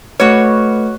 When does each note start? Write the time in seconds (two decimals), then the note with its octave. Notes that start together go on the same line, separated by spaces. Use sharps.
0.20 A3 F#4 B4 C#5